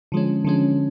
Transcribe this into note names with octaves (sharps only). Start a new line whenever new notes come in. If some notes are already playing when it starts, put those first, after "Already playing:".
D3 F3 G#3 C#4
D3 F3 G#3 C#4